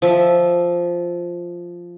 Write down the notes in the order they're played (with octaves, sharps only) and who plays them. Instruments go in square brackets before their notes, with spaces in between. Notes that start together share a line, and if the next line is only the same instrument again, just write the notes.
[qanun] F3 E5